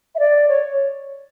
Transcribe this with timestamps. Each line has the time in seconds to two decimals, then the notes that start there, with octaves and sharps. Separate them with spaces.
0.15 E5
0.19 D5
0.48 C#5